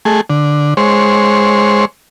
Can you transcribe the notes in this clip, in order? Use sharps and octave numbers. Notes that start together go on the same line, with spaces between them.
A3 G#4
D3
G#3 C5 C#5